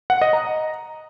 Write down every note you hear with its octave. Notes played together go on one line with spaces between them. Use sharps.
F#5
D#5
A#5